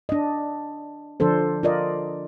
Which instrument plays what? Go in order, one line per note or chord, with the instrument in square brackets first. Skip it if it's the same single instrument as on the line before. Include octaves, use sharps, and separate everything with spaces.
[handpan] D4 D#5
D3 F3 D4 A4 C5
F4 A#4 D5 D#5